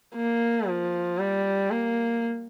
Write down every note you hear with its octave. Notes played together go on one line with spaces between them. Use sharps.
A#3
F3
G3
A#3